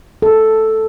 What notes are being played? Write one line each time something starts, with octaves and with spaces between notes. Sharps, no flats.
A4